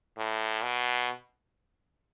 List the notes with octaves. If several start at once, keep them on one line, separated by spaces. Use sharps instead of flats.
A2
B2